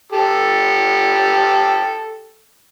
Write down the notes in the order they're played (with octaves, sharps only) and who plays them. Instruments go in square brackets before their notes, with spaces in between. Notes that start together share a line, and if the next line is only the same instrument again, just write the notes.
[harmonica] G4 A4